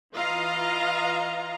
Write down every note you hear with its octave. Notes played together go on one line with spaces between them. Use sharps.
E3 F4 D#5 F5 A#5